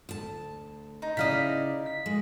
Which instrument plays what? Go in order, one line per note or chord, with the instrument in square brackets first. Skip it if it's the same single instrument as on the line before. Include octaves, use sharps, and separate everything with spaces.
[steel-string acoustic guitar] D2 A5
[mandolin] D#4
[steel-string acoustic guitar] C#3 E4 D5 [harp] D#5 F5 B6
[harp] B6
[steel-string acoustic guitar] G#3